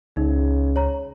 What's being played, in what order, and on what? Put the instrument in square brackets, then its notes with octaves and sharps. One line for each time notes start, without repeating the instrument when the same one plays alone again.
[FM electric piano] C#2 [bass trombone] C#3 [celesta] D#4
[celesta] C#5 A#5